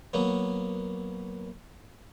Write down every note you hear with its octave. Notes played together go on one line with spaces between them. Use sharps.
F#3 A#3 B3